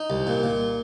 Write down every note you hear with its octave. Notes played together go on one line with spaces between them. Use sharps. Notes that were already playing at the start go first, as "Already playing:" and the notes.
Already playing: D#4
C2
A#2
A#2